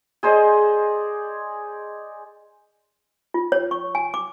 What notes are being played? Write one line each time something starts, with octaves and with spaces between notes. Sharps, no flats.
G#4 C5 D5 D#5
F4
C#5
C#6
G#5
D6